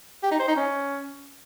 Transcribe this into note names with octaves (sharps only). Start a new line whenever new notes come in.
G4
D#4
C5
D#4
C#4